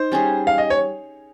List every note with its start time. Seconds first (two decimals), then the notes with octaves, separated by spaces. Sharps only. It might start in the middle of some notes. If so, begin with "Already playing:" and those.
Already playing: D#4 C5
0.12 G3 C#4 G#4
0.47 F5
0.58 D#5
0.70 C#5